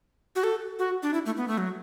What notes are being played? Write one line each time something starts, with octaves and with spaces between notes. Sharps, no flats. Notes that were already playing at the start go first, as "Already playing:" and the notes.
F#4
A4
F#4
D4
E4
A3
B3
A3
F#3